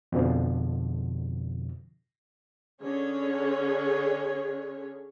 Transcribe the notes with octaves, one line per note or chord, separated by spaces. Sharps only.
F2 B2 D3 F3
D3 C#4 G#4 C#5